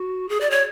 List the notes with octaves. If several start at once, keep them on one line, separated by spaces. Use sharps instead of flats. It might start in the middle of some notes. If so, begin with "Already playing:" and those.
Already playing: F#4
G#4
D5
C#5